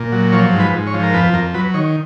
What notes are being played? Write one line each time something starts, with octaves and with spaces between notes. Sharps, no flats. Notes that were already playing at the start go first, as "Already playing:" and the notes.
Already playing: A#2
F#3
F3 C#5
G#2
B4
G#2
C#5
F3
A#4
F2 B4
F2 A#4
F#3 B4
D#3 C#5